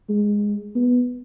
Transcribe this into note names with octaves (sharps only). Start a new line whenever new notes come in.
G#3
B3